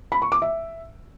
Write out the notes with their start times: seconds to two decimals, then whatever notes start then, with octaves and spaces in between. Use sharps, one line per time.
0.12 B5
0.22 C#6
0.32 D6
0.42 E5